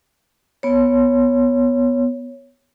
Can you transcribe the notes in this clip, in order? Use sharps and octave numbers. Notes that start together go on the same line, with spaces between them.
B3 C#5